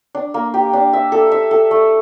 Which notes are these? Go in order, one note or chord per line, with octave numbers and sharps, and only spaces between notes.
D4
A#3
G4
D4
E5
A4
E5
A4
A3